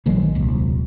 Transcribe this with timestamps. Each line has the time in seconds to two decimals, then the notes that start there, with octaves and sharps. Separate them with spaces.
0.06 A#1 D#3 F#3 G#3
0.35 D#1 C2